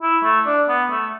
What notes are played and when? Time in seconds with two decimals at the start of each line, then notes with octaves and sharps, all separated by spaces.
0.03 E4
0.24 A3
0.46 D4
0.68 B3
0.90 A3